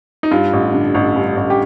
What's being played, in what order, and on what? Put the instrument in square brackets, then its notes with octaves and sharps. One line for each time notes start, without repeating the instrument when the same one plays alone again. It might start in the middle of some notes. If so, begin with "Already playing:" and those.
[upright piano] D#4
G2 F4
A1
D3
A1
G2
A1
G4